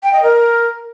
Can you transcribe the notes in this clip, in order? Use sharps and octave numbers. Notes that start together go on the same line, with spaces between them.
G5
D#5
A#4